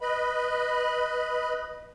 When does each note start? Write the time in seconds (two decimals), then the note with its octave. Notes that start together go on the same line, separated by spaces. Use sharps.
0.01 B4 D#5 B5